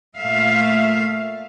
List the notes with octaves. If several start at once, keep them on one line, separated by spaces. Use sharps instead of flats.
A#2 A3 E5 F5